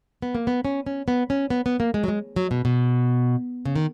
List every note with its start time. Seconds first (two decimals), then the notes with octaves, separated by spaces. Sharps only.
0.22 B3
0.35 A#3
0.47 B3
0.65 C#4
0.86 C#4
1.08 B3
1.30 C#4
1.50 B3
1.66 B3
1.80 A#3
1.94 G#3
2.04 F#3
2.08 G#3
2.36 F#3
2.51 B2
2.65 B2
3.65 C#3
3.76 D#3